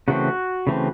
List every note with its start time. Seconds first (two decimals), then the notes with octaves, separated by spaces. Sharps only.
0.08 C#3 E3 A3 C4 F#4
0.67 C#3 E3 A3 C4